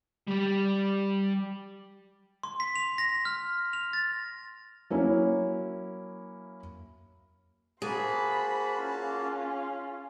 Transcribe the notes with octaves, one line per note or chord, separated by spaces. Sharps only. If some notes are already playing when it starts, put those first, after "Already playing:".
G3 D5
C6
B6
F7
A#6
F6
F7
A6
F#3 A#3 C#4 E4 C#5
A#3 F#4 G#4 C5 A5 B5
C#4 F4